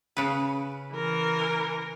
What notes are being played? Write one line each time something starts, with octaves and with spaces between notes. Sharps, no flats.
C#3 B4
E3 A#4